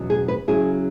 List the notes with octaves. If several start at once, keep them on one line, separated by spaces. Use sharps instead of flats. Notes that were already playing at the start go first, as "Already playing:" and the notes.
Already playing: E2 B2 F#3 C#4 E4
G#4
B4
C#3 F#3 C#4 E4 G#4